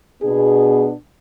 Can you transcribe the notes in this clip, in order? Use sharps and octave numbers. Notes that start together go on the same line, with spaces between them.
B2 B3 D4 G#4